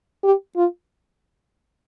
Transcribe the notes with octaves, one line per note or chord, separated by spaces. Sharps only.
G4
F4